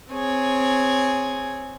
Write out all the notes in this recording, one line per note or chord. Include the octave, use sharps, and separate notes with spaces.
C4 G#4 C#5